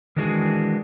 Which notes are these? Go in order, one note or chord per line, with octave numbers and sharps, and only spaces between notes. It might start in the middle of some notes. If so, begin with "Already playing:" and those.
D#3 E3 G#3 D4 F#4 G#4